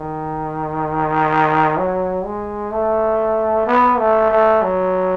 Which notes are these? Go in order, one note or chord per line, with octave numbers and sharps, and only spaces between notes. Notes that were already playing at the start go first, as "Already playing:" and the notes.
Already playing: D#3
F#3
G#3
A3
B3
A3
A3
F#3